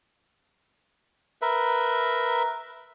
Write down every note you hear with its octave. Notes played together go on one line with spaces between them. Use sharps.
A#4 B4 E5